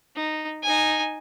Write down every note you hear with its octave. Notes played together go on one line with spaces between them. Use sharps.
D#4
D#4 G#5